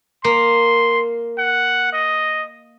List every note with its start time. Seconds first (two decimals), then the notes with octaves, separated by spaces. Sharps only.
0.24 A#3 C6
1.38 F#5
1.93 D#5